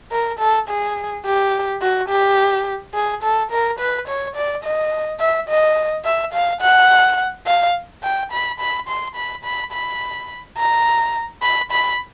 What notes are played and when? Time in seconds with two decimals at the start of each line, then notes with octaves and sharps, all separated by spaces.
0.12 A#4
0.39 A4
0.68 G#4
1.25 G4
1.82 F#4
2.09 G4
2.94 G#4
3.23 A4
3.51 A#4
3.79 B4
4.08 C#5
4.36 D5
4.64 D#5
5.20 E5
5.49 D#5
6.05 E5
6.33 F5
6.61 F#5
7.47 F5
8.03 G5
8.32 B5
8.60 B5
8.88 C6
9.16 B5
9.45 B5
9.73 B5
10.57 A#5
11.42 B5
11.71 B5